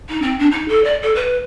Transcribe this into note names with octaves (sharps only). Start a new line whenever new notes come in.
D#4
C4
D4
D#4
A4
D5
A4
B4